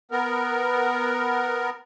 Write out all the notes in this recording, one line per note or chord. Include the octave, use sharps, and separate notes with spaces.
B3 A#4